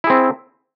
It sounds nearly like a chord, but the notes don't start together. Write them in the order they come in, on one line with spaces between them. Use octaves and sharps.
E4 G#4 C4